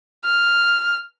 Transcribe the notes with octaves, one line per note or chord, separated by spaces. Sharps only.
F6